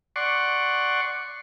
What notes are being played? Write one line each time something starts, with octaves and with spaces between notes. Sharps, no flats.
D5 F#5 C6 C#6